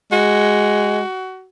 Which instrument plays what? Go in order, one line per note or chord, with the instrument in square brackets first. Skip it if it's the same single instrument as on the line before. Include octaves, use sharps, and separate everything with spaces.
[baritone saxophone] G#3 [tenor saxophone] F#4